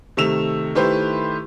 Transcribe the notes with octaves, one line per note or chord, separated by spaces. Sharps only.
C3 D#3 A3 E6 E7 F7
D#3 A3 E4 G4 B4 C5